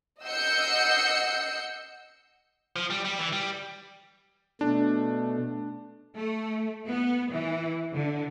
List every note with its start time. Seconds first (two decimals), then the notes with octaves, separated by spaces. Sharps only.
0.24 D#5 F#5 E6 G6 C7 C#7
2.76 F3
2.90 G3
3.05 G3
3.19 E3
3.33 G3
4.61 B2 A3 D4
6.14 A3
6.87 B3
7.31 E3
7.91 D3